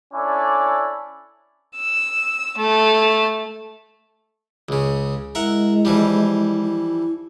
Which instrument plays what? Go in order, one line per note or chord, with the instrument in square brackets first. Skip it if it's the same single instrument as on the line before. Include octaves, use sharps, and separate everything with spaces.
[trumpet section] C#4 D4 E4 A4 D5 G#5
[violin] E6
A3
[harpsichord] C#2 C#3
[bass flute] G#3 [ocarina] E4 [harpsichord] A#4 E5 F#5
[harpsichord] E3 F3 G3
[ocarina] E4